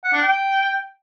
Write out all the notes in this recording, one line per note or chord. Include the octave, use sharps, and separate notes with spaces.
F#5
D4
G5